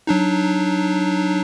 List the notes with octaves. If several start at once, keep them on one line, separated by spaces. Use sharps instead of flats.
F#3 D4 D#4